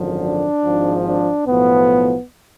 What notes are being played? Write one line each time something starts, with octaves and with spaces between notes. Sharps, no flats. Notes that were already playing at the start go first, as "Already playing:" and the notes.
Already playing: G#1 F#2 D3 F3
D4
G#1 G#2 F3
D4
B1 A2 F3 B3